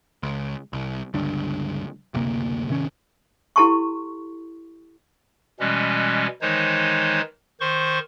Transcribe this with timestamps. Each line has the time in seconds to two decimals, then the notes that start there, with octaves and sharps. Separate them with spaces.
0.23 C#2
0.73 C2
1.14 C#2 G2 D3
2.14 F#1 D2 C3 A#3
2.69 G#1 C3 D#3 C#4
3.56 E4 G4 A4 A5 C6 C#6
5.60 B2 E3 G3 G#3 C#4
6.41 D#3 E3 G#3 D#4 C5 C#5
7.60 D#3 C5 C6 C#6